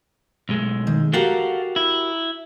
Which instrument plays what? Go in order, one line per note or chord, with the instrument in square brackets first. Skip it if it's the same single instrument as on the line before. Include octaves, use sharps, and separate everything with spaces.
[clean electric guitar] B1 G#3 A3
[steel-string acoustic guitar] D#3
[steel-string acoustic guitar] F#4 G4 A#4 [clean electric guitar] A4 F5 F#5
[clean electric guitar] E4